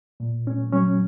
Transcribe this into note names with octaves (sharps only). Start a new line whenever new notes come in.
A#2
A#2 C#4
F#3 C#4